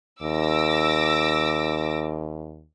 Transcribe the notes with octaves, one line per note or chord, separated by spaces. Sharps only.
D#2 D6 E6 A#6